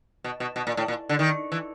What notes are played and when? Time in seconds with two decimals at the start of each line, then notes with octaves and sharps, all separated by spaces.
0.24 B2
0.40 B2
0.56 B2
0.67 A#2
0.77 A2
0.88 A#2
1.09 D3
1.19 D#3
1.52 E3